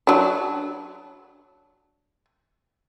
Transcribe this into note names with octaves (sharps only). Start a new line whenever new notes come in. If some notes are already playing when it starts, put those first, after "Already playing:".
F#3 D4